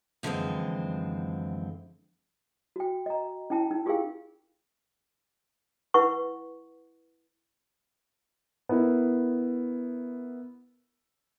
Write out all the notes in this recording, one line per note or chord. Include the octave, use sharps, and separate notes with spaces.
F#2 D3 E3 F3 G#3 C4
F#4 G5
D#5 A#5
C#4 E4 G5 A5
D#4
F4 G4 G#4 A#4 F5 G5
E4 B4 F#5 C#6
B3 E4 A#4